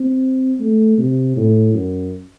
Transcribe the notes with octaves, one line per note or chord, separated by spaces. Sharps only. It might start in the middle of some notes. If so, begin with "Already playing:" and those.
Already playing: C4
A3
C3
A2
F#2